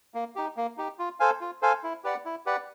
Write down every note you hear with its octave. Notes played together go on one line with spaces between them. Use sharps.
A#3
D#4 G4
A#3
D#4 G4
F4
A4 C5 F5 G#5
F4
A4 C5 F5 G#5
E4
G4 B4 D5 F#5
E4
G4 B4 D5 F#5